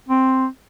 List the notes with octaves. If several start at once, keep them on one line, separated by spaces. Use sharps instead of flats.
C4